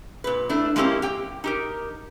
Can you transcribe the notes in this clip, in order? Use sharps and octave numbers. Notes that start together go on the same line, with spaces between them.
A#2 B4
A3 D4 E4
G#3 A#3 C4 C#4 E4 G4
G4 G5
D#4 G4 A#4